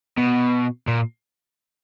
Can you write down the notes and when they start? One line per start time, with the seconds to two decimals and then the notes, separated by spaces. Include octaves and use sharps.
0.18 B2
0.88 A#2